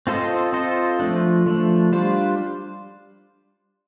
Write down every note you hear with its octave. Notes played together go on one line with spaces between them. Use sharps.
C4 F4 A4 C5 D#5
C4 F4 A4 C5 D#5
F3 A3 D4
F3 A3 D4
G3 D4 F4 C5